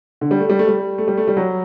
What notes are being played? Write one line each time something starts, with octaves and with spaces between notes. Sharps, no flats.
D3
G3
A3
G3
A3
G3
A3
G3
A3
G3
F#3